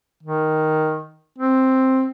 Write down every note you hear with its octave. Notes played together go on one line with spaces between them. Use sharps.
D#3
C4